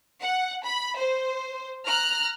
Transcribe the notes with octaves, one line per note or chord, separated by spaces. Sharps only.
F#5
B5
C5
A#5 F6 F#6